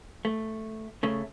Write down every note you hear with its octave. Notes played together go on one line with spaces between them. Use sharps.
A3
C#3 A3